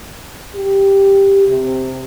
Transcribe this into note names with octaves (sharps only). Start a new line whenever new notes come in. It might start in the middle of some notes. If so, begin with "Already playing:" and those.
G4
C3